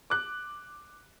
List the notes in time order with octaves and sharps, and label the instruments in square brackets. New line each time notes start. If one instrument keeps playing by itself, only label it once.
[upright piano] D6 F#6